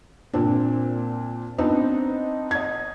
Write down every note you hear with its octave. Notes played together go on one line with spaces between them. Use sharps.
A#2 C4 D4
B3 C4 D4 D#4
D#5 G#6